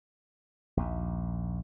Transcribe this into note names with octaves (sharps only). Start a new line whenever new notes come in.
A#1 D#2